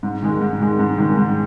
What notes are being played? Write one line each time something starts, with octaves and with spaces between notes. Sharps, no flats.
G#2
D#3 G#3
G#2
D#3 G#3
G#2
D#3 G#3
G#2